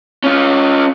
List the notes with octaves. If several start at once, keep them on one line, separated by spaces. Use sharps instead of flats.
C#4 F4